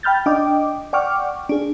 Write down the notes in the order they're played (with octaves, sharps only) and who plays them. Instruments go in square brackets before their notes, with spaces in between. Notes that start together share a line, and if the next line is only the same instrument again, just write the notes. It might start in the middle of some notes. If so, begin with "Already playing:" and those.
[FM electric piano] G5 B5 F6 G6 A6
D4 D#5 G5 D6
D5 F#5 G5 C#6 D6 F6
D4 G#4